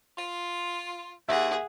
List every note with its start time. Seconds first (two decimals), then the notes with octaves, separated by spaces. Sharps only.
0.18 F4
1.29 D#2 G#4 E5 F#5